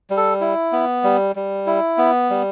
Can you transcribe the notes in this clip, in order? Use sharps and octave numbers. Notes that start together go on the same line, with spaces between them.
G3
A4
E4
B3
G3
G3
E4
B3
G3